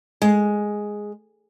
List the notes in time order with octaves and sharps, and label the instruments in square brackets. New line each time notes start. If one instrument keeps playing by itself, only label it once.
[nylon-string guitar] G#3